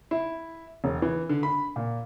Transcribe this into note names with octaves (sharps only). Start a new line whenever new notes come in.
E4
E1
E3
D3
B5
A#2